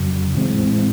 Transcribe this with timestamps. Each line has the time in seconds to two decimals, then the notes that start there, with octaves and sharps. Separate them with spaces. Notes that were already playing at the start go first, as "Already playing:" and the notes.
Already playing: F2 C#3 F#3
0.35 A2 E3 G#3 C4